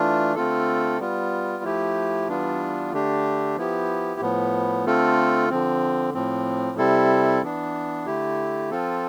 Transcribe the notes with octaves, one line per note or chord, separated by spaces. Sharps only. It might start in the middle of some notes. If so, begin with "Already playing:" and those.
Already playing: E3 A3 D4 F4
D3 A3 C4 F4 A4
G3 B3 F4
F3 A3 E4 G4
E3 G3 B3 D4 F4
D3 A3 D4 G4
F3 B3 E4 G4
A2 F3 B3
D3 A3 C4 F4 A4
D3 F3 C4
A2 F3 C4
C3 G3 C4 E4 A4
E3 B3 D4
D3 A3 E4 G4
F3 C4 F4 A4